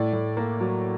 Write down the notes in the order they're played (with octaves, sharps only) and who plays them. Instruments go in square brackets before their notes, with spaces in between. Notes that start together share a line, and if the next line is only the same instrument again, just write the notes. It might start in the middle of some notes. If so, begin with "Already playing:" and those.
Already playing: [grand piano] A2 D5
A2
A#3
F#3